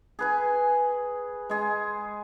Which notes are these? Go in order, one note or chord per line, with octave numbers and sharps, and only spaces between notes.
G#4 B4 G#5
G#3 G#4